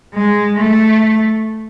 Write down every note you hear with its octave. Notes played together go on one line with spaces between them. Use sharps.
G#3
A3